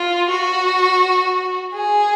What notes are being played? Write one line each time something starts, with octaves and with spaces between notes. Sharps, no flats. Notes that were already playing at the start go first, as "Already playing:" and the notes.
Already playing: F4
F#4
G#4